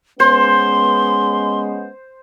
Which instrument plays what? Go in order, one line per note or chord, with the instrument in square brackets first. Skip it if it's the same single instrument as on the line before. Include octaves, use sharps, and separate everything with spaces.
[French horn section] G#3 B3 C#4 [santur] C5 [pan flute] C6